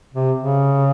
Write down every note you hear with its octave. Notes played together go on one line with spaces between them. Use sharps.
C3
C#3